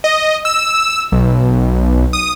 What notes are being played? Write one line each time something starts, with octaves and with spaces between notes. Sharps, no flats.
D#5
E6
B1
D#6